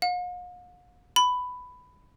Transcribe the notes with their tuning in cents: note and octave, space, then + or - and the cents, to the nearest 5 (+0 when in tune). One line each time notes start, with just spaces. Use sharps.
F5 +45
B5 +10